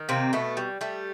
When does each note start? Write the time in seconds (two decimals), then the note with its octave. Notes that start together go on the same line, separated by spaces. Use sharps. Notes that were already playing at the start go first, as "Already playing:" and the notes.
Already playing: D#3
0.09 C3 A#3 C4
0.33 B2 A3 B3
0.57 G3
0.81 G3 A3